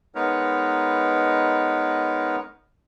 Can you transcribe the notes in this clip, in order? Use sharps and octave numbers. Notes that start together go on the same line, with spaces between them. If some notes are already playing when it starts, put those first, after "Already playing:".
G#3 B3 D#4 A#4 B4 C#5